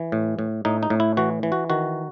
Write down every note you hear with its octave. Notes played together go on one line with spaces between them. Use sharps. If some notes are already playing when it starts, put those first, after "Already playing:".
Already playing: E3
A2
A2
A2 D#4
D#4
A2
E4
E3 F#4
E3
F#4
D#3 F#4